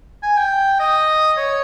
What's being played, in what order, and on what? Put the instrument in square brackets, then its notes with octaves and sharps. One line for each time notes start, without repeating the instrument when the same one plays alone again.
[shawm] G#5
G5
D#5
C#5